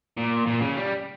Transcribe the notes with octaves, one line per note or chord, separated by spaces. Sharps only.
A#2
A#2
C#3
G3